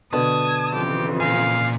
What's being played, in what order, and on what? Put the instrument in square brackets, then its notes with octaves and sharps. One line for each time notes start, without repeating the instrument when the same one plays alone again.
[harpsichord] B2 D3 [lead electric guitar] A5 [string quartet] D#6 G#6
[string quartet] F2 C#3 E3 [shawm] G4
[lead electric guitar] A#2 G#5 [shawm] F5